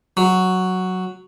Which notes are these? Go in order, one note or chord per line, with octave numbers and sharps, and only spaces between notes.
F#3